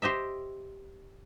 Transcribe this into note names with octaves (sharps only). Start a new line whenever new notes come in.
G4 C5 D#5 E5